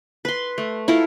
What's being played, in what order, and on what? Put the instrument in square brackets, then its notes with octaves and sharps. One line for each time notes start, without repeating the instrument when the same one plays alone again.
[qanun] B4 C6
A3
E4 F4 A4 A#4